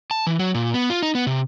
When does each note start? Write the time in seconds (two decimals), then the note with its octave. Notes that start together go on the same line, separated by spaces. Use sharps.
0.11 A5
0.27 E3
0.39 F#3
0.54 A#2
0.74 B3
0.90 F4
1.03 D#4
1.15 B3
1.27 C3